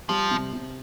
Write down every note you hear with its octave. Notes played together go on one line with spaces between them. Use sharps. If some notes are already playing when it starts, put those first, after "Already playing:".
F3 G3
C3
C3